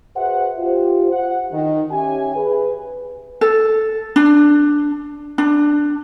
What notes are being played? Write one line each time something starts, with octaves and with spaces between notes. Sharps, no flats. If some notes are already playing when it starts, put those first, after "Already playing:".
F#4 G#4 B4 C5 E5 F#5
F4 G4 C5
F#5
D#3
C#4 G4 E5 G#5
G#4 B4
A4
D4
D4